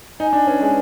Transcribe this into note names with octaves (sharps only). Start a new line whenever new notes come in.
D#4 G#5
D4
C#4 B4
G#3